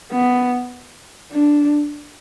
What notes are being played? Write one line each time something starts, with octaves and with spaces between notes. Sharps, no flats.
B3
D4